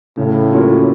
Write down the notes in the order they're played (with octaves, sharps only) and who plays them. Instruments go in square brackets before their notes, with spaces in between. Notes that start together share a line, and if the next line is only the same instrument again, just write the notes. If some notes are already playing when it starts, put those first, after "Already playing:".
[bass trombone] A2 [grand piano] C#3
[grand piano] F#3 A#3 C#4 F4